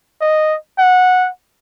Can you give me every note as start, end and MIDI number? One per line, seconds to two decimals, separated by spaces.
0.21 0.57 75
0.79 1.29 78